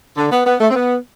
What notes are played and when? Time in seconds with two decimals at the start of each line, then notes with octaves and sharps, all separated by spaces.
0.17 D3
0.32 B3
0.46 B3
0.61 A3
0.70 C4
0.76 B3